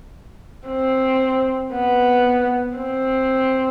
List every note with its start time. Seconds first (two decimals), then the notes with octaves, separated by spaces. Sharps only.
0.67 C4
1.73 B3
2.77 C4